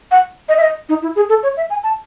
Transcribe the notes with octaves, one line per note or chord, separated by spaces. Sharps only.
F#5
D#5
E5
D#5
D#4
E4
G#4
A4
C#5
E5
G#5
A5